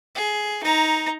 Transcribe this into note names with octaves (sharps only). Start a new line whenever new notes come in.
G#4
D#4 A#5